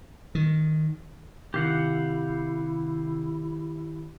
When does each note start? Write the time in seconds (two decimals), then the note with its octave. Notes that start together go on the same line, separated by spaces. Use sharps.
0.35 D#3
1.54 C3 D#3 E4 G4 F5 F#5